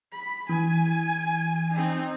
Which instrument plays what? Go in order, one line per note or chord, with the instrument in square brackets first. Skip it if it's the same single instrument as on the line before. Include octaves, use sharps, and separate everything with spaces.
[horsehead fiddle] B5
[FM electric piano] E3 [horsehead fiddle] G#5
[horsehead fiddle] C4 D#4